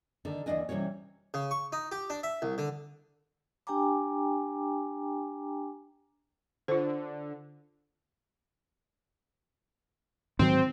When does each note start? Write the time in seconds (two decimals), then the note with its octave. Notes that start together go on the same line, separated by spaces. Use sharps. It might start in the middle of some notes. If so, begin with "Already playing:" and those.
0.25 D3 D#3
0.46 D#2 G#2 E3 D4 D#5 G#5
0.69 C3 E3 F3 G3 C#4 C#5
1.34 C#3
1.51 C#6
1.72 D#4
1.92 G4
2.10 D4
2.23 E5
2.42 C2
2.58 D3
3.67 D4 G4 G5 G#5 A#5 D6
6.68 D3 F4 C5
10.39 G#2 D#3 F#3 C4